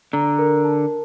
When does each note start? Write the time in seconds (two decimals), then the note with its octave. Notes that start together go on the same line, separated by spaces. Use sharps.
0.13 D3 A#5
0.39 A#4
0.64 A5